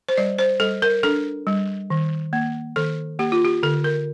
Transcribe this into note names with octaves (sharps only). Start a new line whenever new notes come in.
C5
G3 D5
C5
G3 A4
A#4
D4 A4
G3
D#3
A#3
D#3 A4
A#3 G4
F4
G4
D3 A4
A#4